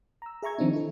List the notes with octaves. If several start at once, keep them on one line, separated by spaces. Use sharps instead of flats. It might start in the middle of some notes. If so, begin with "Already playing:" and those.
A#5 E6
G#4 E5 A#5 C#6 G#6
D#3 F3 C4 D4 D#4
E4 A4